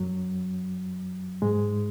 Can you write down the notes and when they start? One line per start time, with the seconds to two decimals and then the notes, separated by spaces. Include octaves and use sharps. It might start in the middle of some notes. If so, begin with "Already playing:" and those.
Already playing: F#2 F#3
1.42 G#2 G#3